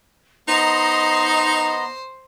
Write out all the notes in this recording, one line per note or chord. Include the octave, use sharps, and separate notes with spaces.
B3 D#4 C5 D#5 A#5 C6